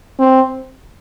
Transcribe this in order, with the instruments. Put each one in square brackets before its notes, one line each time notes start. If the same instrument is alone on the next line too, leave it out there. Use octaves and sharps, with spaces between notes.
[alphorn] C4